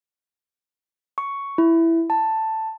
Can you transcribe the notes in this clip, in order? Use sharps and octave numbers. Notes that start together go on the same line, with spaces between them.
C#6
E4
A5